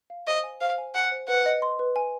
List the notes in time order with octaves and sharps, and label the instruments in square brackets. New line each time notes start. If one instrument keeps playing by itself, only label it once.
[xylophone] F5
[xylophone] C5 [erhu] D#5
[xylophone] G#5
[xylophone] C5 [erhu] F5
[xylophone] G#5
[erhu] F#5 [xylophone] G#5
[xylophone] C5
[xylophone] B4 [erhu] F#5
[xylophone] D#5
C6
B4
G#5